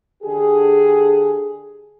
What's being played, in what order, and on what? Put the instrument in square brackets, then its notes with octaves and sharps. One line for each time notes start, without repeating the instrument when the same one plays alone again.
[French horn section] D3 G4 G#4